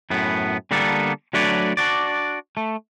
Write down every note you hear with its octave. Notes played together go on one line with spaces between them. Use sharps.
F#2 A2 B3
D3 G3 A#3 B3 A4
F#3 A3 D4 B4 C#5 D5
D4 F#4 D5
A3